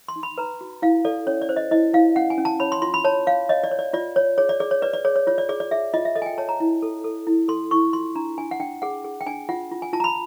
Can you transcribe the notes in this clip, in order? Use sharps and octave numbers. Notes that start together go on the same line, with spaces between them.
C6
D#4
B5
B4 A#5
F#4
E4 F5
A4 D5
C#4 C#5
D5
C5
D#5
E4 D#5
E4 F5
C#4 F#5
G#5
C#4
A5
C#5 B5
C6
F4 C6
B5
C#5 A5
C#5 F5
C#5 D#5
D5
C#5
D5
F4 D5
C#5
G#4 C#5
D5
G#4 D5
C#5
B4 D5
D5
G#4 C#5
C#5
F4 C#5
D5
G#4 D5
D5
G#4 E5
F4 D#5
E5
A4 D#5
G#5
G5
C#5 A5
A#5
E4
A4
A4
E4
A4 C6
E4 C#6
F4 C6
D4 A#5
D4 G#5
F#5
D4 G5
G#4 F#5
G#4
G5
D4 G#5
F4 F#5
F4
G#5
F4 A5
A#5
B5